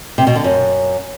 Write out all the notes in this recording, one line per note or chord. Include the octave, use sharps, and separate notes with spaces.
C3
B2
D3
F#2